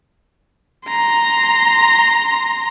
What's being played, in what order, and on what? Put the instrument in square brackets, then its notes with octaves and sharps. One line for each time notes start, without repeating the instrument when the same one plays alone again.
[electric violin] A#5 C6